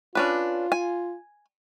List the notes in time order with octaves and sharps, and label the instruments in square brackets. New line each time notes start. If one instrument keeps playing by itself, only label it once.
[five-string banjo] C#4 D4 B4 [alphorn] F4
[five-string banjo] G#5